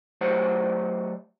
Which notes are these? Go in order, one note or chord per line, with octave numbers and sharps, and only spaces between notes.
F#3 A3 G4 C5 C#5 F#5